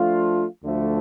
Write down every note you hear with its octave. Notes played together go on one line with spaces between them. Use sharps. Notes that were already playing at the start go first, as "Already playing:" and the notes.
Already playing: F3 A3 D4 F4
D2 D3 F3 A3